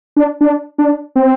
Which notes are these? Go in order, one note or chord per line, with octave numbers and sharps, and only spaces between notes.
D4
D4
D4
C4